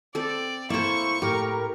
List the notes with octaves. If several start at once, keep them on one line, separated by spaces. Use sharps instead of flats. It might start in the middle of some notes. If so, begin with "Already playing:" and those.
C4 A4 D5
A#3 E4 A4 C5 C#6
A2 G4 A#4